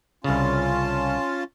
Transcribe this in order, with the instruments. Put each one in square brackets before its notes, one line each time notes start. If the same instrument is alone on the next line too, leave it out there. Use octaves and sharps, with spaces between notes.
[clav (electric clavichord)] C2 C#3 [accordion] C#4 F4 A5